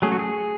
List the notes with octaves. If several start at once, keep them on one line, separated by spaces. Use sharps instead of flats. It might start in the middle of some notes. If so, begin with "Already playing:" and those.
F#3 A3 C#4 G#4
F#4
G#4